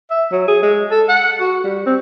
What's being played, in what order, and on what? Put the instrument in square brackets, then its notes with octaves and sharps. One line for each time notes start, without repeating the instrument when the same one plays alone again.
[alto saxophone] E5
F#3
G#4
G#3
A4
F#5
F#4
G3
C4